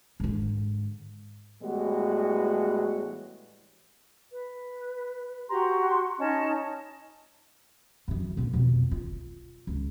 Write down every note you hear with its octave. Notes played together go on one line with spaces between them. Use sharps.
G#2 D3
A2 E3 G3 G#3 B3 F#4
B4
F#4 G4 A#5 C6
C#4 D#4 D#5 A5
F#2 E3
A#2 D3
F2 B2
F4
C#2